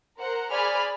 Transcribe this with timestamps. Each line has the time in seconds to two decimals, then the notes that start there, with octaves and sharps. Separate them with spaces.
0.19 A#4 C5 F#5
0.50 G#4 C5 D5 G#5 B5 F6